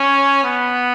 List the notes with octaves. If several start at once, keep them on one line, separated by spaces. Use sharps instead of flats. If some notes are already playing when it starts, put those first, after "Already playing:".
Already playing: C#4
B3